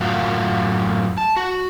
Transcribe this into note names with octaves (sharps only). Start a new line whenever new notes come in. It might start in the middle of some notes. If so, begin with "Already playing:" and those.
F#2 A2 F4 F#4
A5
F#4